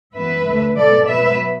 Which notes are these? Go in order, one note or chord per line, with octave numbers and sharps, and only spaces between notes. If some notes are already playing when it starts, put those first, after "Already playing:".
F#2 E3 B3 B4 E5
D2 D3 A3
B2 F#3 B3 A4 D5
B2 F#3 B3 B4 E5